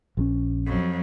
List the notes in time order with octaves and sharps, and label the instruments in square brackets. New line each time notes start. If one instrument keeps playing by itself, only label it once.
[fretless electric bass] A#1 F3 C#4
[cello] F2 F#3